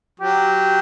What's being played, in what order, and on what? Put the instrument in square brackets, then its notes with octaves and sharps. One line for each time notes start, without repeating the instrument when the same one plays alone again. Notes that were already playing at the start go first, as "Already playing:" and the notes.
[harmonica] F#3 [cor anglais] G4